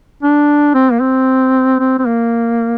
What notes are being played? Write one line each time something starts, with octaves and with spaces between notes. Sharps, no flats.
D4
C4
A#3
C4
C4
C4
A#3